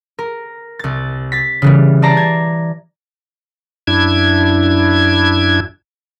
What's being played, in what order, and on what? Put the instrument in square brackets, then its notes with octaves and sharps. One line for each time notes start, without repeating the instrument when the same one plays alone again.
[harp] A#4
C2 A6
A6 B6
C#3 E3 G3
D5 A5 A#5 C7 D7
G#6
[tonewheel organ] F#2 D4 E4 G#6